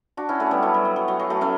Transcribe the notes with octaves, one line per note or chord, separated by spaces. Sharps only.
D4 F#4
C#4 E4
A3 C#4
G3 B3
F#3 A3
G3
F#3
F#3
F#3
F#3
F#3 A3
A3 C#4